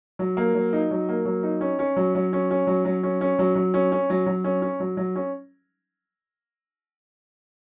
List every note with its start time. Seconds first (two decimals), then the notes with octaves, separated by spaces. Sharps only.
0.19 F#3
0.37 A#3
0.55 F#3
0.73 D#4
0.91 F#3
1.09 A#3
1.25 F#3
1.43 D#4
1.61 C#4
1.79 C#4
1.96 F#3
2.15 F#3
2.33 C#4
2.50 C#4
2.67 F#3
2.85 F#3
3.03 C#4
3.21 C#4
3.39 F#3
3.55 F#3
3.74 C#4
3.92 C#4
4.10 F#3
4.26 F#3
4.44 C#4
4.62 C#4
4.80 F#3
4.97 F#3
5.16 C#4